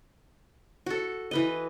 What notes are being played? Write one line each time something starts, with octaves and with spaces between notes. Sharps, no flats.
F#4 A4
E3 B4 D#5